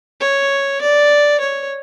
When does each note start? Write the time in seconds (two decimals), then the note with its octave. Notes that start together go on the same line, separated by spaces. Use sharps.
0.20 C#5
0.81 D5
1.40 C#5